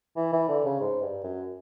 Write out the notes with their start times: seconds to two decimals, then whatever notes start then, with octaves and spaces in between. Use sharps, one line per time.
0.17 E3
0.33 E3
0.48 D3
0.65 C#3
0.80 G#2
1.02 G2
1.23 F#2